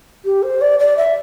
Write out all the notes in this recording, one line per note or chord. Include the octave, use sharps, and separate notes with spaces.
G4
C5
D5
D5
E5